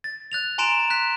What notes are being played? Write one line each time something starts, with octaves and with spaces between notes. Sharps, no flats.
A6
F#6 A6 F7
G#5 A#5 C6 D7 E7 F7
F#6 B6